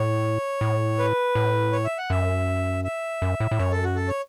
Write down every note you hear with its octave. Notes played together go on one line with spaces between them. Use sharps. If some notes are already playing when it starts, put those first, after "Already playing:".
Already playing: A2 C#5
A2
B4
A2
C#5
E5
F#5
F#2 E5
E5
F#2
A2
A2
F#2 C#5
A4
F#4
A4
C#5